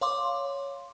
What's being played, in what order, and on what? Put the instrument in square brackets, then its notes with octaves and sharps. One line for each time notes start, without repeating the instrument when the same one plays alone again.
[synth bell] C#5 F5 C6 D6